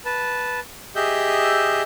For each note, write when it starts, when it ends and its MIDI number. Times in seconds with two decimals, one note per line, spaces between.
0.05 0.60 71
0.05 0.60 81
0.96 1.83 67
0.96 1.83 68
0.96 1.83 75
0.96 1.83 76
0.96 1.83 88
0.96 1.83 91